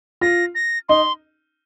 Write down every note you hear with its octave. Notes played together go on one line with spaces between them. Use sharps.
F4 A#6
A#6
D#4 C6